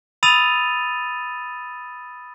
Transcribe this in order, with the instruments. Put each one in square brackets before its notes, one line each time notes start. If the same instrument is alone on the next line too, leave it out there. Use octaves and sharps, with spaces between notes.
[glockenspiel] B5 D#6 E6 A6 D#7 F7